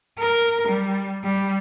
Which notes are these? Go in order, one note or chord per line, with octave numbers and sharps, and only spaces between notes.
A#4
G3
G3